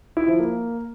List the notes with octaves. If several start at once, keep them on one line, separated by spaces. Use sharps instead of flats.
E4
F3
A#3